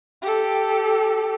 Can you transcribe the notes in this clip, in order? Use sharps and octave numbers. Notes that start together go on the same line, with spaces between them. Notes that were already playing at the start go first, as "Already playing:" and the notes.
G4 A4